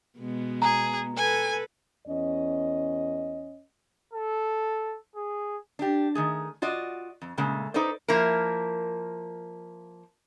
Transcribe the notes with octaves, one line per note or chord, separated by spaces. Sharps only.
B2 G#3 B3
G#4 A#5
A4 B4 G#5
E2 C#4 D#5
A4
G#4
D4 G4
D#3 A3 G#4
F4 F#4 D5 D#5
F2
A#2 C#3 G#3 A3
D#4 A4 B4 C5 D5
F3 A#3 E4 A#4